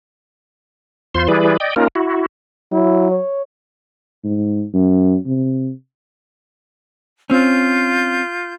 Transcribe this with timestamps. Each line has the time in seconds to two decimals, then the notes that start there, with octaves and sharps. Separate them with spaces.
1.15 E2 F4 C5 C6
1.28 E3 G3 E4 G#4 B4 D5
1.60 D5 D#5 G5
1.76 A#3 C#4 D#4 F4 A#4
1.95 E4 F#4
2.72 F#3 E4
3.11 C#5
4.24 G#2
4.74 F#2
5.26 C3
7.30 C4 C#4 F4 G6